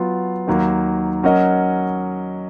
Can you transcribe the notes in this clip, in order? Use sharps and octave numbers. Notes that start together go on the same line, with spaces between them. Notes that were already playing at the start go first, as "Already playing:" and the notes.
Already playing: F#3 B3 F4
D#2 D#3 F#3 A#3
F#3 C#4 F#4 A#4 D#5